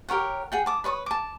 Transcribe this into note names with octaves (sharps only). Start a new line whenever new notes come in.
G4 A#4 C#5 F#5
G#4 F#5 G5
A5 D6 D#6
B4 C#5 C#6 D#6
A5 D6